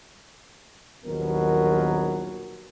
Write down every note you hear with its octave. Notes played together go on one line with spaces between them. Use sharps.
A#1 D#2 B2 F#3 B3 A#4